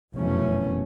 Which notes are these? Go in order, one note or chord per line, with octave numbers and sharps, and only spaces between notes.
F1 F#2 B2 E3 A3 C#4